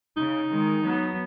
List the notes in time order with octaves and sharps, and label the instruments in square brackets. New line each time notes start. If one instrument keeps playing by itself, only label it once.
[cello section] C#3 [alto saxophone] D#4
[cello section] D#3 G#3
F#3 B3